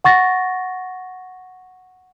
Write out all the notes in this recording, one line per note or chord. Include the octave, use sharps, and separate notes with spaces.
F#5 C#6 A6 A#6